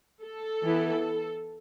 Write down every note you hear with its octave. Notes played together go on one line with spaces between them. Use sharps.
A4
E3 B3 E4